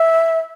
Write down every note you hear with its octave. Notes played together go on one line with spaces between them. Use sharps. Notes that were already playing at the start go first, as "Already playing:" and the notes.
Already playing: E5